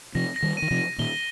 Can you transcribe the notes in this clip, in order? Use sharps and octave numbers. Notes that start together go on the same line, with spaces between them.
C3 F3 A#6
A#6
D#3 G3
D#7
D#3
C3 F3
D#7
A#2 D#3 G7